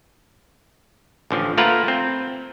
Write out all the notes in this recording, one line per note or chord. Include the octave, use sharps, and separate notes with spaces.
A1 D3 F3
A3 A#3 F4 A#4 B4 F#5
C4